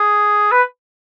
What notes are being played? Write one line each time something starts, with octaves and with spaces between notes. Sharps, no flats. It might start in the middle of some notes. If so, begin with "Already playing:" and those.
Already playing: G#4
B4